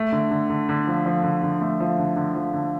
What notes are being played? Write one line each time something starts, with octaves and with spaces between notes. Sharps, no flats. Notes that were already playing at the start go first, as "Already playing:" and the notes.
Already playing: A3
D3
D3
D3
D3
F3
F3
D3
D3
A3
F3
D3
D3
F3
D3